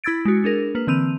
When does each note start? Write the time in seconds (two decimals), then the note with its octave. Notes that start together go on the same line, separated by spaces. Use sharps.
0.04 E4 B5 E6 G#6 A6 D7
0.25 G#3 F#4
0.44 D4 G#4 A#4
0.75 A#3 B4
0.87 D3 E3 C4 E6 D#7 F7